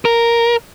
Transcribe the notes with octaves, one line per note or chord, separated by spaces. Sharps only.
A#4